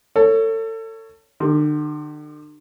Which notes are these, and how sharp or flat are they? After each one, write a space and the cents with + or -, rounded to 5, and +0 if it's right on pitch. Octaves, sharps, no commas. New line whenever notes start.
A4 +30 C#5 +5
D3 +45 G4 +0